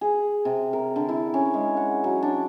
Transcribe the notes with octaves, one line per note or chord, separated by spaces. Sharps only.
G#4
C3
A#4
D3
E4
C#4
G#3
F#5
F#3
D4